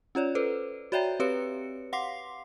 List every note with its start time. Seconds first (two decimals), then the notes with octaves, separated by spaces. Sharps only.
0.15 C#4 F4 C#5 D5
0.35 A4 B4 C5
0.92 F#4 C#5 D5 E5 G5 A#5
1.20 C4 G4 B4 C#5 C#7
1.93 F5 F#5 C6 D6 C7